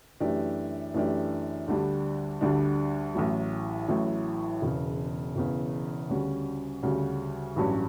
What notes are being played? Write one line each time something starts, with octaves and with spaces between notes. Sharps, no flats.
F#2 E3 A3 D4 G4
F#2 E3 A3 D4 G4
D2 D3 G3 D4
D2 D3 G3 D4
A1 A2 F#3
A1 A2 F#3
E1 E2 C#3
E1 E2 C#3
D2 C#3 G3 C#4 F#4
D2 C#3 G3 C#4 F#4
A1 G2 F#3 C#4